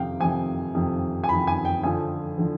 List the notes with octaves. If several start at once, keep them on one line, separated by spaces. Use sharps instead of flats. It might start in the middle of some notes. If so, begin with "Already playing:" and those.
Already playing: F2 C3 D#3 F5 G5
F2 C3 D#3 G#5
F2 C3 D#3
G#5
F2 C3 D#3 B5
G#5
G5
F2 D3 F3 G#5
D3 F3